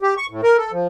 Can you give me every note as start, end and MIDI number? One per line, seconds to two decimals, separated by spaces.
0.02 0.14 67
0.17 0.26 85
0.30 0.41 45
0.43 0.57 70
0.57 0.72 69
0.72 0.87 53